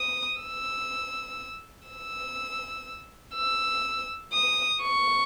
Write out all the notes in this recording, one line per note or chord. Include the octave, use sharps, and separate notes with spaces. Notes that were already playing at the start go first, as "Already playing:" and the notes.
Already playing: D#6
E6
E6
E6
D#6
C#6